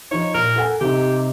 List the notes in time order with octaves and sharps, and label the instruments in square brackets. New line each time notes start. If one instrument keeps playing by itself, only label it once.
[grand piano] F3 D#4 [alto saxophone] C#5
[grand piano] A#2 [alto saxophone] A#4
[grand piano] A4 F#5 G#5
[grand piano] C3 D#4 [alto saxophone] G4